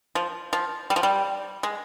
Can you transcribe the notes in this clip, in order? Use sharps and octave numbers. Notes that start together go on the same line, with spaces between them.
F3
F3
G3
F3
G3
G#3